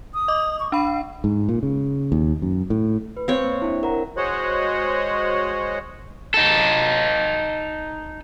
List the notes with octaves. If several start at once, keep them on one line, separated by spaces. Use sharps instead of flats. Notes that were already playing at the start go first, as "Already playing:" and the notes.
D#6
D#5 D6
C#6
D4 F5 B5
G#2
A#2
C#3
D#2
F#2
A2
B4
C4 C5 C#5 F5
A#3
D4 E4
A#4 F#5 A#5
G#3 F#4 C5 C#5 D#5 F#5
D#4 A4